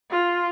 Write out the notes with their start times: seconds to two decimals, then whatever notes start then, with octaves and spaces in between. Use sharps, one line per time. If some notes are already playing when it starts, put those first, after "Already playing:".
0.11 F4